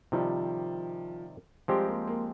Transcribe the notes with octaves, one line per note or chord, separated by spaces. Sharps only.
C3 D#3 F3 G3
F3 G3 G#3 C4 G4 A#4
A#3
A#3